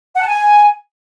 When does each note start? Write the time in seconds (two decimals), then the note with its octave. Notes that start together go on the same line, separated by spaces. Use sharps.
0.15 F#5
0.21 A5
0.27 G#5